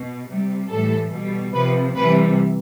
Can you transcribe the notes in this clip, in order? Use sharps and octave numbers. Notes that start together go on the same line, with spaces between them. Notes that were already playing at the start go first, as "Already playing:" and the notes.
Already playing: B2
C3 G3
A2 E3 G3 A4
B2 G3
C3 F3 B4
C3 E3 G3 B4